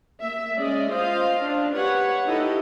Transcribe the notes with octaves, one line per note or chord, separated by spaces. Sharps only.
A#3 E5
G#3 C#4 D5 D#5
F4 C5 D#5 F5
D4
G4 B4 C#5 F#5
D#4 E4 G4 A4 D#5